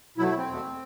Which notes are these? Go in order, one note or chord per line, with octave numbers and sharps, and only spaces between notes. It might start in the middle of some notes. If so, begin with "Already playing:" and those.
B2 F#3 A3 E4
E4
C4
E2 B2 A3